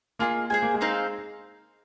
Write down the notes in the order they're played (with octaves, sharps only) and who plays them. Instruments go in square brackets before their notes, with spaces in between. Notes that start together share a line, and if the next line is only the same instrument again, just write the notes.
[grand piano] A#3 [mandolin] F4 G#4 D#5
[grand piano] G#3 [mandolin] G#4 C5 G#5
[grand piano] A#3
G#3
[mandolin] C4 D#4 C5 F5